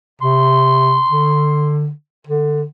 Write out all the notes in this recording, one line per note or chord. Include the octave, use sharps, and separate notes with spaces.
C3 C6
D3
D3